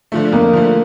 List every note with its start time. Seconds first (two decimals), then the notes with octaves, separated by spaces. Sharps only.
0.12 D3 F3 A3
0.33 F2 A#3
0.53 D3 F3 A3